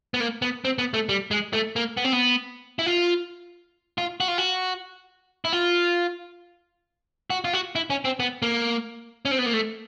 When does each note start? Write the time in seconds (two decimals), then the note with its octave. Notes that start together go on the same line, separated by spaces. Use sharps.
0.14 B3
0.20 A#3
0.42 B3
0.65 C4
0.79 B3
0.94 A3
1.09 G3
1.31 G#3
1.53 A3
1.76 A#3
1.97 B3
2.05 C4
2.13 B3
2.79 E4
2.86 F4
3.98 F4
4.20 F#4
4.28 F4
4.38 F#4
5.45 E4
5.53 F4
7.30 F#4
7.45 F4
7.53 F#4
7.75 E4
7.90 C#4
8.05 C4
8.20 B3
8.42 A#3
9.25 C#4
9.31 C4
9.38 B3
9.46 A#3
9.53 A3